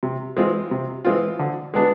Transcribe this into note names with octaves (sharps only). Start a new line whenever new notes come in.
C3
E3 G#3 C4 F4
C3
E3 G#3 C4 F4
D3
G#3 B3 D4